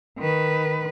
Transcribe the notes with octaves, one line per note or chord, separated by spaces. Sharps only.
D#3 B4